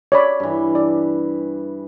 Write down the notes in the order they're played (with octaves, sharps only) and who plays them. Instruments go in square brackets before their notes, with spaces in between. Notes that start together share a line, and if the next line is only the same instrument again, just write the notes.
[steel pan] C#5 D5 B5
[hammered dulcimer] G2 E3
[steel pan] D5